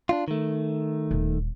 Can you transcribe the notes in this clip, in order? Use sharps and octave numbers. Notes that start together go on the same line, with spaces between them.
D4 D#4 F4
D#3 A3
D#1